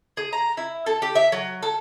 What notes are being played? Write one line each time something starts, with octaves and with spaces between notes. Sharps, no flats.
G#4
A#5
E4
A4
G4
E5
F#3
A4